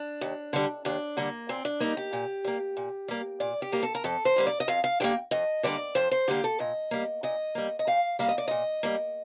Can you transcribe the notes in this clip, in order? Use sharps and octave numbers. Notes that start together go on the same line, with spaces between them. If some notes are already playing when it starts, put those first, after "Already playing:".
Already playing: D4
D#2
D3 G3
D#2 D4
D3 G3 A#3
A#2 C4
D4
G3 A#3 D#4
G4
A#2
G3 A#3
A#2
G3 A#3
A#2 D5
G4
G3 A#3
A4
A#4
F2 A4
C5
D3 G3 A#3
D5
D#5
F2 F5
F5
D3 G3 A#3 G5
F2 D#5
D3 G3 A#3 D5
F2 C5
C5
D3 G3 A#3 G4
A4
A#2 D#5
G3 A#3
A#2 D#5
G3 A#3
D#5
A#2 F5
G3 A#3 F5
D#5
D5
A#2 D#5
G3 A#3